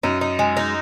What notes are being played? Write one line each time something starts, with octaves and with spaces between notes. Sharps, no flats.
F#2 D#4
D#4
G#3
D#4